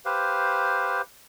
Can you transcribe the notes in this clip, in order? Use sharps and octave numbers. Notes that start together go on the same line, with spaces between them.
G4 B4 C5 F5